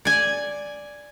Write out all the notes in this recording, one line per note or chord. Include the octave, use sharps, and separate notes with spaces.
D5 G#5